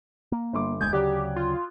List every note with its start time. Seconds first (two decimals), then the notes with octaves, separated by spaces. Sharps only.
0.32 A#3
0.53 G1 C6 D6
0.81 E1 D2 G#3 D#6 G6 G#6
0.93 D2 C#3 F#3 G4 D5 G5 F#6
1.36 F4